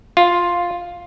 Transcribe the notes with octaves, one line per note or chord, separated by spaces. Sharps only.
F4